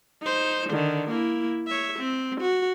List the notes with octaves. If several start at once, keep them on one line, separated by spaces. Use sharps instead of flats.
D#4 C5
D3 D#3
A#3 E4
C#5 E5
C4
F#4